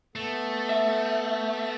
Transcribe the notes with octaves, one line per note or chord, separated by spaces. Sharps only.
A3 B3 A4
E5